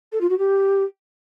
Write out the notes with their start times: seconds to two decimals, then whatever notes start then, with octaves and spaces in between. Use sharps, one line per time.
0.12 A4
0.21 F4
0.30 F#4
0.38 G4